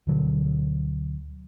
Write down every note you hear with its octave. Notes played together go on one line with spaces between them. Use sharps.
D2 B2 D3 F#3